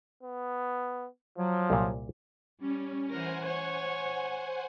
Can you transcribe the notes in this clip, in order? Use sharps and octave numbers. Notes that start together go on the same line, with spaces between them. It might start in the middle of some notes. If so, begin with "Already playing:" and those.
B3
F3 F#3
C2 A#2
G3 C#4
E3 A#4 C5 F#5 G#5
C#5